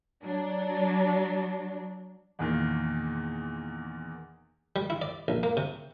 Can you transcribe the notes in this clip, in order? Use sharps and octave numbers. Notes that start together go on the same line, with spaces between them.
F#3 D4
E2 A#2 D#3
G3
E4
D5
A#1
A#3
C3